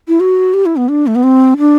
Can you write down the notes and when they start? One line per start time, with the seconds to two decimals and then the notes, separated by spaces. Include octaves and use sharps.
0.08 E4
0.20 F#4
0.54 G4
0.66 E4
0.76 B3
0.89 D4
1.07 A3
1.15 B3
1.23 C4
1.58 D4